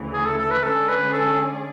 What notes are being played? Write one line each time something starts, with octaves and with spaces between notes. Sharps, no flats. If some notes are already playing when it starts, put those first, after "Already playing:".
Already playing: D2 C#3 E3
G#4
A4
A4
B4
D3 G#3 C#4 G#4 A4 D5
B4
A4